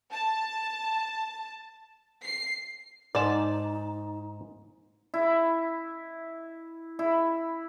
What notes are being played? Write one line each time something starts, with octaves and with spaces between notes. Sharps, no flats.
A5
C7
G#2 D#4 D5 A5
E4
E4